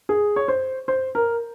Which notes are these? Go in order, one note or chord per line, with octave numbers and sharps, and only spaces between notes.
G#4
C#5
C5
C5
A#4